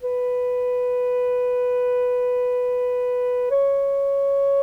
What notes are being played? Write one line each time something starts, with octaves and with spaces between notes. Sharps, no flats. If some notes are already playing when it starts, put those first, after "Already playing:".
B4
C#5